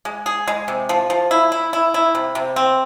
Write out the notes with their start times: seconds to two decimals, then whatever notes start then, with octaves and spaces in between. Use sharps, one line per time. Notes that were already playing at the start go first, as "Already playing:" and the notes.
0.05 G#3
0.26 G#4
0.48 G#3
0.68 C3
0.89 F3
1.10 F3
1.31 E4
1.52 E4
1.73 E4
1.94 E4
2.15 C3
2.35 C3
2.56 C4